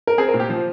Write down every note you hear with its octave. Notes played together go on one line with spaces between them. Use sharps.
A#4
C4 G#4
A#4
A#2
G4
F3